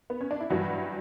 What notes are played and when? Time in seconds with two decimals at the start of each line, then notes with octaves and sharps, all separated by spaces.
0.10 B3
0.21 C#4
0.31 D4
0.40 E4
0.50 G2 E3 F#3 G3 F#4